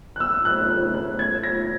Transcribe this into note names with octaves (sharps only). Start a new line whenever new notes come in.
F#6
E6
F#6
F#6
F#6
G#6
A#6